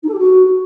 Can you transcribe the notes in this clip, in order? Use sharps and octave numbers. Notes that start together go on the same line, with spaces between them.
D#4
A4
G4
F#4